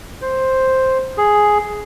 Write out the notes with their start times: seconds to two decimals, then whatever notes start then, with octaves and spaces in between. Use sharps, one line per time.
0.22 C5
1.17 G#4